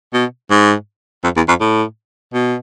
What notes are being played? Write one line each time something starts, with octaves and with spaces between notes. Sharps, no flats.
B2
G#2
F2
E2
F2
A2
B2